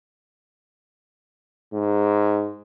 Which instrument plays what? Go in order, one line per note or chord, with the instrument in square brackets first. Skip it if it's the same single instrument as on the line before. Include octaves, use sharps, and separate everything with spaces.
[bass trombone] G#2